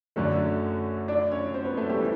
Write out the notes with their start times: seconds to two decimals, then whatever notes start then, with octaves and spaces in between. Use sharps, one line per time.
0.16 F#2 D3 F#3 A3 C#4 C#5
1.08 D4 D5
1.31 C#4 C#5
1.54 C4 C5
1.66 B3 B4
1.77 A3 A4
1.89 G3 G4
2.01 E3